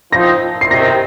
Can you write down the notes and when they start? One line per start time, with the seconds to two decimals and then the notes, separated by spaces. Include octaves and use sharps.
0.12 F3 C4 D#4 A#6
0.61 C7
0.71 C3 D#3 C4 A#6